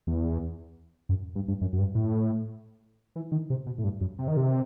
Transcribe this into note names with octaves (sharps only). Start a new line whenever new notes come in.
E2
F#2
G2
G2
F#2
F#2
G2
A2
E3
D#3
C3
B2
A2
G2
F#2
C3
D#3
C3